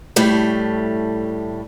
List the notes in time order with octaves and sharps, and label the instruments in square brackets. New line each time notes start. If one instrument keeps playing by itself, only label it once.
[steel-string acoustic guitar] A2 G3 A3